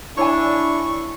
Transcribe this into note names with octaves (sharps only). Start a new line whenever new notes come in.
D4 E4 C#5 G#5 C#6